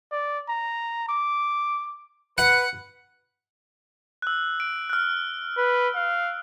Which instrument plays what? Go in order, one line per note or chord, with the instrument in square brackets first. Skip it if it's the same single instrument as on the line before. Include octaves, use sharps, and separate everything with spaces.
[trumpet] D5
A#5
D6
[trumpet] B4 [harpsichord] F#5
[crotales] E6 F#6
D7
F6 F#6
[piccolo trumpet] B4
F5